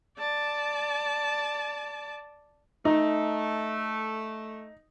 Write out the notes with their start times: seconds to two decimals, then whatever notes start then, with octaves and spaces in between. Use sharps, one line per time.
0.18 D5 A5
2.85 A3 D#4